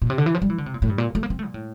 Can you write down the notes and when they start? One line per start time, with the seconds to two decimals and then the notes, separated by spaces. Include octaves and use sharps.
0.02 A#2
0.10 C3
0.18 D3
0.26 E3
0.34 F3
0.42 G3
0.50 E3
0.58 D3
0.66 C3
0.74 A#2
0.82 A2
0.90 G2
0.98 A#2
1.15 A3
1.23 A#3
1.30 C4
1.39 A3
1.47 A#2
1.54 A2